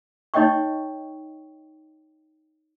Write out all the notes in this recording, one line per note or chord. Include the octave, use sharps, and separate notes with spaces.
D#4 C#5 D#5 G5 C#6